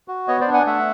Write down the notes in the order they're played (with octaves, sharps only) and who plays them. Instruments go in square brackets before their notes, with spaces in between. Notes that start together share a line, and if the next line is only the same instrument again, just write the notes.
[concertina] F#4
B3 C#5 D#5
C5 D5
D4
F#5 G#5
A3 E5 F#5